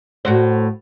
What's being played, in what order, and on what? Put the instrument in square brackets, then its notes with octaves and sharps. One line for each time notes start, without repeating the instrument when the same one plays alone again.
[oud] A2 F#4 C5